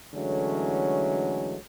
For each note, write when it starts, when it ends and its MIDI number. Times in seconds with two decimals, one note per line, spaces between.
0.14 1.56 50
0.14 1.56 52
0.14 1.56 54
0.14 1.56 56
0.14 1.56 57
0.14 1.56 61